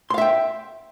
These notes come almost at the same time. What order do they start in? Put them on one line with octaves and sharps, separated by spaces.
C6 F5 E5 G5